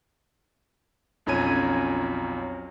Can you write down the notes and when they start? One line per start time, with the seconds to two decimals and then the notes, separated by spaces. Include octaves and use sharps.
1.26 B1 F2 C#4 A#5 G#6 D#7